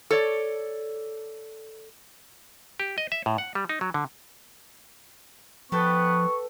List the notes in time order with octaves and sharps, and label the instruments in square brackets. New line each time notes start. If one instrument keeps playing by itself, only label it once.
[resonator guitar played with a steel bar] A4 C#5 D5
[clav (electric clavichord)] G4
D#5
E5
A2
F#5
G3
D#4
F#3
D3
[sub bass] F3 [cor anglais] B3 [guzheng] A4 B4 G5 [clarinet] C#6